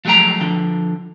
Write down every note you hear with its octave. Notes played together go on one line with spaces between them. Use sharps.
F3 F#3 G#3 A3 G5 A#5
D3 F3